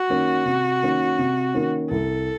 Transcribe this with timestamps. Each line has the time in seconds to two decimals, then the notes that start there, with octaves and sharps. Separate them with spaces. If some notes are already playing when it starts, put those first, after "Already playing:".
Already playing: F#4
0.10 D#3 A#3 C#4
0.46 C3
0.82 D#3 A#3 C#4
1.19 C3
1.54 D#3 A#3 C#4
1.90 C2 A4